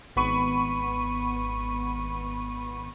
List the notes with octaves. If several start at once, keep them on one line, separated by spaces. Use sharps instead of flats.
G#1 B3 B5 C#6 D#7